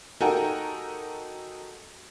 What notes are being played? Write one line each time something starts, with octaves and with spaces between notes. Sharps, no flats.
D#4 F#4 G4 A4 A#4 G#5